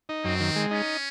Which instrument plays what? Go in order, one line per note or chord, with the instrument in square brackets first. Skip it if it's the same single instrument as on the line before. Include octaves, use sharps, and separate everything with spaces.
[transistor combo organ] D#4
[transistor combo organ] F#2 [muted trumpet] C4
[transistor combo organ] D#3
G#3
[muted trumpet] C#4 [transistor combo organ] D#4